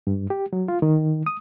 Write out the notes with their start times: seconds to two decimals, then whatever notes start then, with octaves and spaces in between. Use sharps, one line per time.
0.07 G2
0.30 G4
0.53 F#3
0.68 F4
0.82 D#3
1.26 D#6